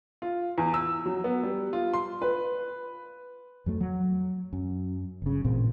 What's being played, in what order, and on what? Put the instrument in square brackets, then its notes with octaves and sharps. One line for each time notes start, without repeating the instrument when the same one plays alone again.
[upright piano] F4
E2
E6
F#3
B3
G3
F4
C6
B4
[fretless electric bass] F2 F#3 A3
F#3
F#2
G1 C#3
A1 A#2 C4